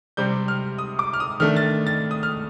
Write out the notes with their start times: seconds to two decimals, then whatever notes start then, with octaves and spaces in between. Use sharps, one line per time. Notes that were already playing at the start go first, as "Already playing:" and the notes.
0.17 C3 G3 C4 G6
0.48 F6
0.78 D#6
0.99 D6
1.13 F6
1.20 D#6
1.40 D#3 A3 D4 F6
1.56 A6
1.87 A6
2.11 D#6
2.23 F6